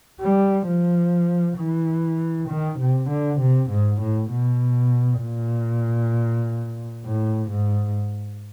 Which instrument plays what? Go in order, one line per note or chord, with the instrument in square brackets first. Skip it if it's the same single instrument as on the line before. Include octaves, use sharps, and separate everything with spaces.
[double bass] G3
F3
E3
D#3
C3
D3
C3
G#2
A2
B2
A#2
A2
G#2